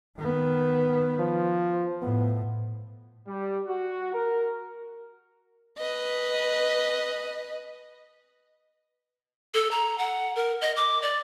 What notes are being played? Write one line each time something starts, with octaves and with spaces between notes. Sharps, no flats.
D#3 B3
F3
A2 B3
G3
F#4
A#4
B4 D#5
A4
A#5
F#5
A#4
D#5
D6
D5